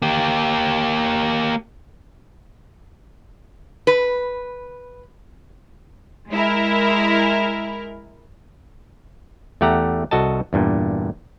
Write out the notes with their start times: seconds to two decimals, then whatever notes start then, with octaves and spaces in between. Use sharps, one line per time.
0.02 A#3 G4
3.87 B4
6.30 G#3 E4 A#4
9.61 E2 A3 G4 F#5 A#5
10.11 C2 F#4 A4 D#5 A5
10.53 E2 G2 A#2